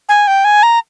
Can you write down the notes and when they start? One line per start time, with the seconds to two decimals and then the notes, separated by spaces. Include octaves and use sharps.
0.09 G#5
0.27 G5
0.44 G#5
0.63 A#5